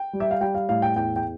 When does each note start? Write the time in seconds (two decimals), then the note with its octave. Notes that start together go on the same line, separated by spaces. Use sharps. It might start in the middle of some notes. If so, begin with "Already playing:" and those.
Already playing: G5
0.13 G3
0.20 E5
0.31 F5
0.41 G3 G5
0.55 F5
0.69 A2 F5
0.82 G5
0.96 E2 G5
1.16 G5